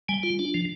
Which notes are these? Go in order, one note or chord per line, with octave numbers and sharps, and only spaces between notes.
G3 G#5
F4
D4
F3